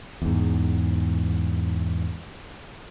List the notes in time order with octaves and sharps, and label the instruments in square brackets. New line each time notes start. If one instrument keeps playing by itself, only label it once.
[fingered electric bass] E2 G#2